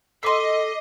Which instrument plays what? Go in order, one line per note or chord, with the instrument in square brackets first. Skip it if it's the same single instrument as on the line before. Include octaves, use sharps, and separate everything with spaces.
[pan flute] A4 [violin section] D#5 [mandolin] C6 E6 [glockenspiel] D6 B6 C7